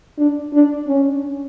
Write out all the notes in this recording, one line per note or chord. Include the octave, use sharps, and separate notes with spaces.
D4
D4
C#4